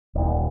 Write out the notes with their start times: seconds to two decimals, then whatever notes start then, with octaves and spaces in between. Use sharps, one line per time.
0.15 D#1